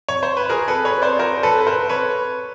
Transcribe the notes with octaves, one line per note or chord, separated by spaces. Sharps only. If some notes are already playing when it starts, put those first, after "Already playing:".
C#5
C5
B4
G#4 A#4
A4 B4
B4 C#5
C5 D5
A#4 C5
A4 B4
B4
A#4 C5
B4 C#5